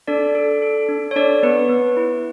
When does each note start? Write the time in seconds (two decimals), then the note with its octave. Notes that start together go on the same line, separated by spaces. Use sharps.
0.08 D4 A4 D5
0.35 A4
0.62 A4
0.89 D4
1.11 C#5
1.16 D4 A4 D5
1.43 B3 B4
1.69 B3
1.97 E4